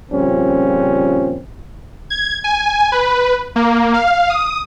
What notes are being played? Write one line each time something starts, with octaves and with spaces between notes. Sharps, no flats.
A#2 C#3 F3 G3 C4 C#4
G#6
G#5
B4
A#3
F5
D#6